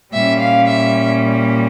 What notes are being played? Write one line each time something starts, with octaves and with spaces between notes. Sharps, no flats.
A#2 G3 C#4 E5
F5
E5